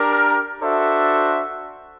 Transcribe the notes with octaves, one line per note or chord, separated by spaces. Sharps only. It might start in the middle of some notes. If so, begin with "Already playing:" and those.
Already playing: D4 G4 A#4
D4 F#4 A4 C5 E5